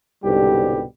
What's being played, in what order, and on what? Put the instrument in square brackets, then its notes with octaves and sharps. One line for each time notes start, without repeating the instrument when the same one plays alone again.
[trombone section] C2 G#2 B2 D3 G3 G4